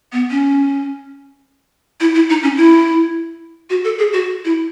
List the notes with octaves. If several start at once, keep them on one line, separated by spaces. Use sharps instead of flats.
B3
C#4
E4
E4
D#4
C#4
E4
F#4
A4
G#4
F#4
E4